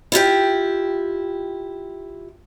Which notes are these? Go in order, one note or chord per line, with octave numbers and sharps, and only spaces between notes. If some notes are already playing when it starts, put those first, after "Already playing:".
E4 F4 G4 G5